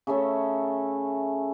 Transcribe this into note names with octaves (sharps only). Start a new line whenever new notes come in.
C#3 A3 C#4 E5